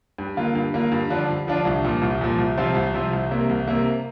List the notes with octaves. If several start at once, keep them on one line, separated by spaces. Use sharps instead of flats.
G2
D3 A#3 F4
G2
D3 A#3 F4
G2
D3 F3 D4 F4
G2
D3 F3 D4 F4
C2
A#2 F3
C2
A#2 F3
C2
C3 F3 C4 F4
C2
C3 F3 C4 F4
C2
C3 A#3
C2
C3 A#3